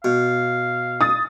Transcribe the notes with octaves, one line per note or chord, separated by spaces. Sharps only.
B2 F5
D#6 A6